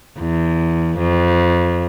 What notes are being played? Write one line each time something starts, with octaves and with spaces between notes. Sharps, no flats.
E2
F2